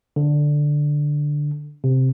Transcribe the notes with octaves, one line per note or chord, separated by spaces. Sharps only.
D3
C3